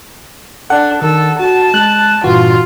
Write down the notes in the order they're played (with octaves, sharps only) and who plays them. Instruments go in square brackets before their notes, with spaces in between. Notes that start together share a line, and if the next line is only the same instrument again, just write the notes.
[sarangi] D4 [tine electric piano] A4 [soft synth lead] F#5
[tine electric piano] D#3 [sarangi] A4
[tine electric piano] F#4 [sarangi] A5
[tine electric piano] G#3 [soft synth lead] F#6
[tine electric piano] G2 A#2 E3 [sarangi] F4 [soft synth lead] F#4